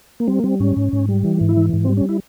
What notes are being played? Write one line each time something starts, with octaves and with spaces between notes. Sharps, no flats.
A#3
G3 C4
A#3
G3 C4
G#2 C#4
G#2
G#2
G3
E3
G#2
E4
E3
G#2
C4
G3
C#4
E4